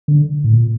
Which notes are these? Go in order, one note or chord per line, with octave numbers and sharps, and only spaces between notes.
D3
A2
A#2